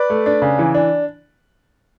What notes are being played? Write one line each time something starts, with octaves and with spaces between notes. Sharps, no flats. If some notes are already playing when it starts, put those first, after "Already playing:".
Already playing: B4 D5
A3
D4
C#3
E3
D4